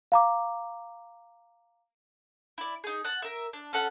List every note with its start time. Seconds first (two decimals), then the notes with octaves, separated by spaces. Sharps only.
0.12 F5 A#5 D6
2.58 E4 D5
2.84 D#4 G#4
3.05 F#5 A5
3.22 A#4 E5
3.53 D4
3.73 C#4 A4 F#5